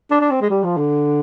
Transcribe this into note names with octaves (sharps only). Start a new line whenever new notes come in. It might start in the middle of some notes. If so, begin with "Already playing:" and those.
D4
D4
C4
G#3
G3
F3
D3